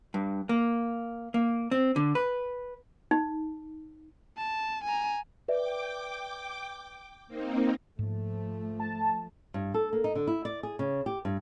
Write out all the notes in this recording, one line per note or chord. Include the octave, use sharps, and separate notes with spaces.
G2
A#3
A#3
C4
D3
B4
D#4
A5
G#5 A#5
B4 D5 E5 G5 D6
A#3 C4 D#4
G#2 F3 A3 A#3
A5
G2
A4
A#3
D#4
D3
E4
D5
G#4
C#3
G4
G2